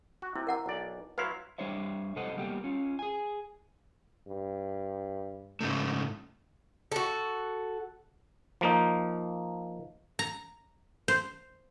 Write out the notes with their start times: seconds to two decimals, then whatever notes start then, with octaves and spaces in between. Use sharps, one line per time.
0.22 F#4
0.36 C3 E4
0.47 A#4 F#5 A#5
0.66 B1 D5
1.18 F#3 E4 B4 F5 C6
1.58 G3 D4 C5 C#5 E5
2.16 C3 A4 C5 D#5 F#5
2.37 G3 A#3 B3 G4
2.64 C#4 F4
2.99 G#4 G#5
4.27 G2
5.61 G#2 C#3 A3
6.92 F#4 A4
8.61 F3 A#3 D#4
10.19 A#5
11.08 C5